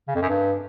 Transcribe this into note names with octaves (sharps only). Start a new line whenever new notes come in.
C#3
F2
F#2
G2